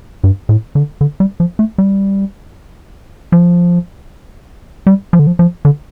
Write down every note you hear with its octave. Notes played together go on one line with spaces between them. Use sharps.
G2
A2
D3
D3
G3
F3
A3
G3
F3
G3
F3
D3
F3
F3
D3